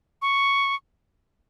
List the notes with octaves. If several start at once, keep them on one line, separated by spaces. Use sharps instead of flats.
C#6